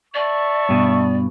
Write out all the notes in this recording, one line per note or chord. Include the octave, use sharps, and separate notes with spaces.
D5 E5 A5 C#6
G2 B2